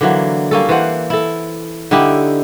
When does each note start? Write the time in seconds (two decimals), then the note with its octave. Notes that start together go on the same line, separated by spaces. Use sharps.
0.01 D3 E3 F#3 A#3
0.51 G3 A#3 C#4 A4
0.69 E3 C5 F#5
1.10 E4 A4
1.91 D3 D#4 E4 G4